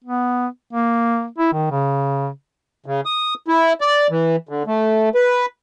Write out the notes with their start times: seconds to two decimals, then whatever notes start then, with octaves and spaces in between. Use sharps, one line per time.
0.05 B3
0.73 A#3
1.38 E4
1.53 D#3
1.71 C#3
2.86 C#3
3.05 D#6
3.48 E4
3.81 D5
4.10 E3
4.49 D3
4.67 A3
5.15 B4